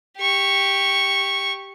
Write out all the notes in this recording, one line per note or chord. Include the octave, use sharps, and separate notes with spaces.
G4 C#6